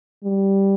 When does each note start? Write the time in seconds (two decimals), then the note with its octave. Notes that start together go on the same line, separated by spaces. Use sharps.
0.24 G3